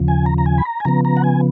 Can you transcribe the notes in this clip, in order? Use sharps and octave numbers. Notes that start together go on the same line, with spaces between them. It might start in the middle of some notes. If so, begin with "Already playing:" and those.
Already playing: D#2 C#3 F3
G#5
A#5
A#5
G#5
B5
A#5
G#5
C#3 F3 B3 A#5
A#5
F#5
G#5